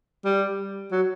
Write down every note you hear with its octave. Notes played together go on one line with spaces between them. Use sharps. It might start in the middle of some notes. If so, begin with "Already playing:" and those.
G3
F#3